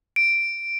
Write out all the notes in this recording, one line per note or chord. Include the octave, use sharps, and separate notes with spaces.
D7